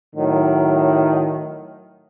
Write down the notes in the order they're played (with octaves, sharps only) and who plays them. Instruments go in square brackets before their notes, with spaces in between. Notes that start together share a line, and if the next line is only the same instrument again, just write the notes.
[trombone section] A2 D#3 F#3